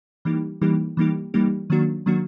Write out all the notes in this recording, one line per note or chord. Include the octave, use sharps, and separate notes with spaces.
E3 G3 A#3 D#4 G4
E3 G3 A#3 D#4 G4
E3 G3 A#3 D#4 G4
E3 G3 A#3 D#4 G4
D#3 F#3 A#3 D4 F#4
D#3 F#3 A#3 D4 F#4